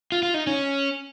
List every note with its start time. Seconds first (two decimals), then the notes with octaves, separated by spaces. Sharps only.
0.12 F4
0.23 F4
0.34 D#4
0.47 C#4